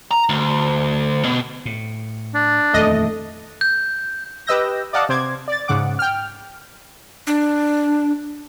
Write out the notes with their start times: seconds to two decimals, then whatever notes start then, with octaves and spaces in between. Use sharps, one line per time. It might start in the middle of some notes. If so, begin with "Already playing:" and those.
0.11 A#5
0.29 D2
1.25 B2
1.66 A2
2.35 D4
2.74 D#1 F2 E3 A3 D#5
3.61 G6
4.47 G4 B4 D#5 E6 G6 A#6
4.93 D5 D#5 F5 F#5 A5 D6
5.09 C3 C5 D6 G#6
5.48 D5 A6
5.68 G#2 C#3 F#5 D6
5.99 G5 F6
7.27 D4